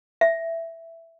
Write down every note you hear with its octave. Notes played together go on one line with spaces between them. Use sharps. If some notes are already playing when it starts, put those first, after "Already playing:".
E5